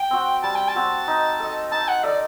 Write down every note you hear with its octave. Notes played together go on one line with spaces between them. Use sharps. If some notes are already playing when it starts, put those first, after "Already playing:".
Already playing: G5
C4 F#4
G3 A5
G5
A5
C4 F#4
D#4
A4 D#5
D#4 A5
F#5
A4 D5 D#5